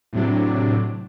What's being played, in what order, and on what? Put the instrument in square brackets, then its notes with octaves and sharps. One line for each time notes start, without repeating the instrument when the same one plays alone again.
[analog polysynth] A2 C3 F#3 D4